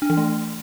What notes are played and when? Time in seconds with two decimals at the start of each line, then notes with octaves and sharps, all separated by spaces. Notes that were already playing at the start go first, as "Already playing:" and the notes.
0.02 D4
0.10 E3
0.17 A3